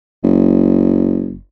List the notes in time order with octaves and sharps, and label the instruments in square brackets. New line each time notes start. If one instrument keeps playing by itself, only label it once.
[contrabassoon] F#1